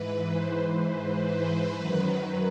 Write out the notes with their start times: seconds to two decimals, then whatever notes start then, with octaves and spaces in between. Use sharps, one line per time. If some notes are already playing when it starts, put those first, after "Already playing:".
Already playing: G#2 E3 B4
0.27 C5
1.72 F#2 D#3 F#3 B4